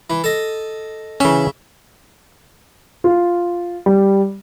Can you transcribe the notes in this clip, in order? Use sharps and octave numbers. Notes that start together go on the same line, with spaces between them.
E3
A4 D#5
C#3 E3 C#4 E5
F4
G3